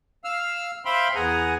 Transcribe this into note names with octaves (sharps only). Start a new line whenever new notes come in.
F5 E6 F6
C5 E5 F5 G5 B5 C6
E2 B3 G#4 F#5 G#5 A#5